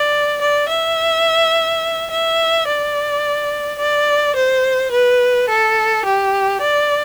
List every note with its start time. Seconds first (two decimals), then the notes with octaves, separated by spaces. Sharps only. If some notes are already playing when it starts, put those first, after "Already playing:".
Already playing: D5
0.41 D5
0.68 E5
2.10 E5
2.67 D5
3.79 D5
4.36 C5
4.91 B4
5.48 A4
6.05 G4
6.61 D5